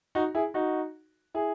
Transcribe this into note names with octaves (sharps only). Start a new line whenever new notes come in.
D#4 F#4
E4 G#4
D#4 F#4
E4 G#4